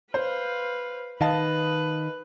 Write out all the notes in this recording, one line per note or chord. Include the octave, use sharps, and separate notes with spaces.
B4 C5 F5
D#3 B4 D#5 F5 A5